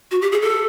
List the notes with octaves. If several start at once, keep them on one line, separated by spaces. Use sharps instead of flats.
F#4
G4
G#4
A4